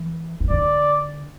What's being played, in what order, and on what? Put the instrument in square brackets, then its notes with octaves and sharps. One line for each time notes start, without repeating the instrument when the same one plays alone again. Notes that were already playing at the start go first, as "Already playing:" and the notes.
Already playing: [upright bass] E3
E3
[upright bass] D3 [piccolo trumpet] D5